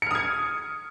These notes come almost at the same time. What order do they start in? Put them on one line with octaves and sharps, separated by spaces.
C#7 F6 D#6 G#6